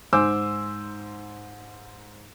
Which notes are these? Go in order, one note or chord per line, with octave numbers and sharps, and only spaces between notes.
G#2 C5 G#5 D6 E6